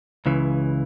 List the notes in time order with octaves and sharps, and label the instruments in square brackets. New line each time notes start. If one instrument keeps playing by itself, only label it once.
[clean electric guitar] C#2 C#3 E3